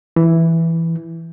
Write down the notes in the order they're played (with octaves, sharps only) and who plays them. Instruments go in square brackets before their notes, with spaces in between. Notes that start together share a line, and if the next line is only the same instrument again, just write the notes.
[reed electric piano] E3